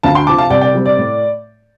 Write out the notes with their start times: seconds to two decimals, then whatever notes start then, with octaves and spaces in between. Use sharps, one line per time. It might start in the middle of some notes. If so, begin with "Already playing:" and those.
0.03 D2 F5 A5
0.15 G5 C6
0.27 C3 F3 A5 D6
0.38 F5 A5
0.50 C2 D5 G5
0.61 D5 G5
0.74 C3 G3 C4
0.86 D5
0.97 A2